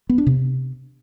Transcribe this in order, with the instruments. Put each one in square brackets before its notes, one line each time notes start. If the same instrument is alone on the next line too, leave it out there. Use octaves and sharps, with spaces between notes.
[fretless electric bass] B3
D4
C3